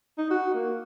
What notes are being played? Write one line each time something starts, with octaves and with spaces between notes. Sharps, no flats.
D#4
F#4
A#3